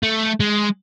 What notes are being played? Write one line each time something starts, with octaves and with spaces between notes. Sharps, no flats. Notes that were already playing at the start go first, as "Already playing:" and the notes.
A3
G#3